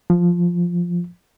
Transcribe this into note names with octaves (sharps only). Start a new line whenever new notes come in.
F3